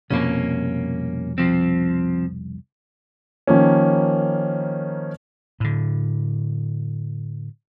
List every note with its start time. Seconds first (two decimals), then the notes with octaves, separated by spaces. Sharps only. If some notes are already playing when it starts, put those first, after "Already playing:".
0.11 C2 F2 B2 A#3 C#4
1.38 F3 C4
3.47 D#3 F3 A#3 C#4
5.60 A2 D3